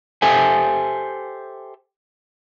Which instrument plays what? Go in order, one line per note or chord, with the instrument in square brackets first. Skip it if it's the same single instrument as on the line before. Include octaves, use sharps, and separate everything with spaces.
[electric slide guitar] G4 A4 C5 E5 G#5